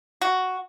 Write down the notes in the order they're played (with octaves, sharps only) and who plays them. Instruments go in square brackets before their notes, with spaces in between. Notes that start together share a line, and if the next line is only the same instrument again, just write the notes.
[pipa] F#4